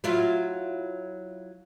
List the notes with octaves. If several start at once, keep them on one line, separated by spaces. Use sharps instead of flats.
F#3 E4 F4